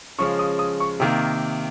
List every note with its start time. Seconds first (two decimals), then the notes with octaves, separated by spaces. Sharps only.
0.18 C#3 F3 G#3 C#4 C#6
0.39 D#6
0.59 D#6
0.80 C#6
1.00 C3 D#3 A#3